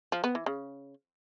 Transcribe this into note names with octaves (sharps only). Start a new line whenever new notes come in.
F3
B3
E3
C#3